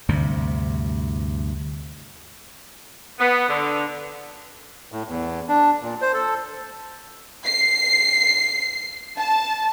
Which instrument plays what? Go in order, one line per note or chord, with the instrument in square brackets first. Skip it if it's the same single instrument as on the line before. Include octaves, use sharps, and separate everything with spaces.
[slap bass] D2 G2 C3
[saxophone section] B3
D3
[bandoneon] A2
E2
D4
A#2
C5
A4
[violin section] C7
A5